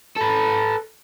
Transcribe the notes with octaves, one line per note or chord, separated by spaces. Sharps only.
A4 B4